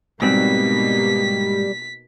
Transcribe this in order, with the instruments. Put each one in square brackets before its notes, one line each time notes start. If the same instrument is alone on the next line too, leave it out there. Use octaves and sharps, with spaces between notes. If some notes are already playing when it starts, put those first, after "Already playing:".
[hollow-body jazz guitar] G#2 C4 F#4 [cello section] B2 A#3 D#4 [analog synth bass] G3 [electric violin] B6